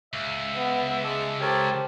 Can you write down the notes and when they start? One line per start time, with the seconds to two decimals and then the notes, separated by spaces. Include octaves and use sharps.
0.13 C#2 E5
0.55 B3
1.04 G#3 E5 A5 D6
1.41 G4 A4 A#4 C5 C#5 A5